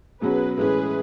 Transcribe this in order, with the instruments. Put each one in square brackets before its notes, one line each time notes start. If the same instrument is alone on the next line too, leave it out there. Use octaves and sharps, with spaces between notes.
[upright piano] B2 F#3 C#4 F#4 [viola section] G#4 B4
[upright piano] A2 E3 G#3 C#4 [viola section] G#4 B4